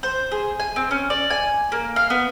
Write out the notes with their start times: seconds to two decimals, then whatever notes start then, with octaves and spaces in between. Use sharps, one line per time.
0.03 C5
0.32 G#4
0.60 G#5
0.76 C4
0.91 C#4
1.10 D5
1.30 G#5
1.72 A#3
1.96 F5
2.10 B3